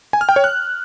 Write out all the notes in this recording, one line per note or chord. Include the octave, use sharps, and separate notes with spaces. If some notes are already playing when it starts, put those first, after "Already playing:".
G#5
F6
G5
C#5
F#6